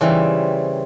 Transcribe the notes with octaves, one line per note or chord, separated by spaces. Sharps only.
C#3 E3 G3 C4